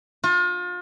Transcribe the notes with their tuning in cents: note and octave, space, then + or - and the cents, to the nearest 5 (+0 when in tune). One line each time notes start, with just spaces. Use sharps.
F4 +35